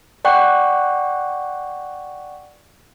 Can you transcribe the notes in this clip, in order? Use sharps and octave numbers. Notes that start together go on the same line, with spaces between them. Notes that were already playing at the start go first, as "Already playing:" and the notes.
D5 F#5 G5 C#6 F#6